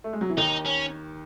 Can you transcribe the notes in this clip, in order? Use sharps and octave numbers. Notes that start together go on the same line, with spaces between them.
A3
G#3
F#3
E3
D#2 D#3 D#4
C#4